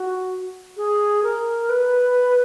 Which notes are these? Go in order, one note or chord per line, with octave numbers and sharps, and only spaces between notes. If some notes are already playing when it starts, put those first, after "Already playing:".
Already playing: F#4
G#4
A#4
B4